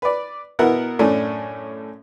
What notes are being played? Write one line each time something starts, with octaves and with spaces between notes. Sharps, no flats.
B4 D5
B2 B3 E4 A#4 F#5
F#2 A2 A3 C#4 D4